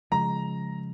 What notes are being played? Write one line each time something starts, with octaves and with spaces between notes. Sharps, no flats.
C#3 F3 G#3 A#5